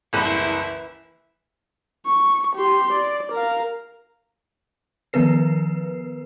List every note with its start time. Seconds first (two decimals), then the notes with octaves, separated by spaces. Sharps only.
0.13 F#1 C2 E3 E4 B4
2.06 C#6
2.55 G4 C6
2.92 D5
3.32 A#4 F5
5.13 D#3 F3 B3 A#4 B4 C7